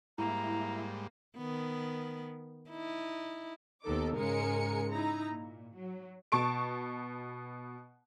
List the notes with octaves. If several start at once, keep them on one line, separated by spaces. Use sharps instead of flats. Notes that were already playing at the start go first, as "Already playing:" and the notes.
G#2 G3 A#3 E4 A#5
D#3 B3
D#4 E4
D#2 D#3 B3 D#4 A4 D6
G#2 C#3 G#3 A#4 G#5 C#7
D#4 E4 A#5
A#2
F#3
B2 A5 C#6 D7